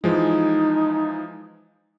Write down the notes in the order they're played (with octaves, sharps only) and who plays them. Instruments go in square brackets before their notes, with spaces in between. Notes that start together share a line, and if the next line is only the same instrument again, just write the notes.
[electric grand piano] E3 F3 G#3 [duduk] D#4